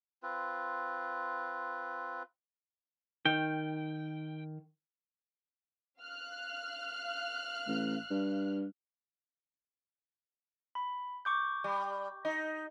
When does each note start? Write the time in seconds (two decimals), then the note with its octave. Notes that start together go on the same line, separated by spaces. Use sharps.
0.23 C4 F4 B4
3.25 D#3 G5
5.99 F5 F6 F#6
7.67 A1
8.11 G2
10.75 B5
11.25 C#6 D6 G6
11.64 G3
12.25 D#4